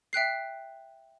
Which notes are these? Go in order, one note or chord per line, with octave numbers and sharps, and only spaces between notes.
E5 G5 F#6 C7